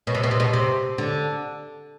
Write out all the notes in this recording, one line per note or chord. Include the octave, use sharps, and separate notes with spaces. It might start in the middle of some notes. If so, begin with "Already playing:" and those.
B2
C3
B2
C3
B2
C3
D3